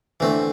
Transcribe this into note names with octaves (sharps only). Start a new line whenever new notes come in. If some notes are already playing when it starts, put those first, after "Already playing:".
D3 E3 A3 C4